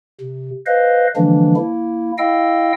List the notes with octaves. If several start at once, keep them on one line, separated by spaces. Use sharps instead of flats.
C3
B4 C5 D#5 F5
D3 E3 F3 G#3 A#3 D4
A#3 E4
E4 D#5 F5 G5 E6